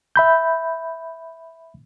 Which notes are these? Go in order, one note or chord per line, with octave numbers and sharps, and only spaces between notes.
E5 B5 G6